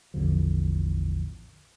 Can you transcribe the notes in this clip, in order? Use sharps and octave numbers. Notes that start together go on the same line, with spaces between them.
A1 E2 D3 F3